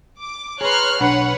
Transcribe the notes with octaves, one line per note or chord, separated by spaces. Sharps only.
D6
G#4 B4 C#5 A#5 C6 F6 F#6
B1 D4 B4 C#5 F#5 B5